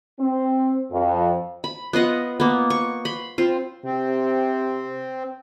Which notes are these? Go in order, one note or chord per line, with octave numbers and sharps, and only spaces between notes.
C4
F2
B5
B3 F4 D#5 F#5
A#3 B3
C#6
B5 C6
C4 F4
C3 C4